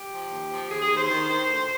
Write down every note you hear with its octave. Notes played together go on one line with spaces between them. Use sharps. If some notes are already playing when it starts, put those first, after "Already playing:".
Already playing: G4
F3
D#2
F3
D#2 G#4
G#4
D#2
C5
D#3
D#3
D2